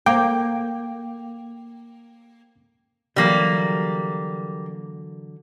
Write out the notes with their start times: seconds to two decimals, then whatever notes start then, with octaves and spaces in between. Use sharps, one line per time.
0.06 A#3 G5 D6
3.16 D3 E3 F#3 G3 A#3